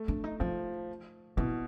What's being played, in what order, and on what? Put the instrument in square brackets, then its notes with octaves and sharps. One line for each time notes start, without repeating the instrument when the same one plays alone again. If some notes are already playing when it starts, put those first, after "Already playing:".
Already playing: [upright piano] A3
[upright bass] D4
D#4
[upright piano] F3 [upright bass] D#4
[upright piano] B2 [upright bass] E4